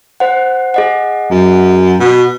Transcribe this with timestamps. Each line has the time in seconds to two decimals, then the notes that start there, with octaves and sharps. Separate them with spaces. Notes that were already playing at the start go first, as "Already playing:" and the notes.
0.20 C5 F#5
0.74 G#4 D#5 F#5
1.31 F#2
2.00 B2